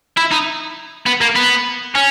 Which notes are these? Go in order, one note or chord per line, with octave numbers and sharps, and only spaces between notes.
E4
D#4
B3
A#3
B3
C#4